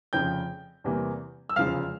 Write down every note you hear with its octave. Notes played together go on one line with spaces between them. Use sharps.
F1 F2 C#3 F3 G5 G6
E2 C3 E3 G3 A#3
E6
F1 E2 C#3 F3 G#3 F5 F6